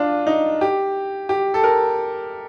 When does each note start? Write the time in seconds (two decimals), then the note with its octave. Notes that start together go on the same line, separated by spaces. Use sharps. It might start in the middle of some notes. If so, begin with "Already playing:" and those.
Already playing: D4 F4
0.27 D#4
0.61 G4
1.29 G4
1.54 A4
1.64 A#4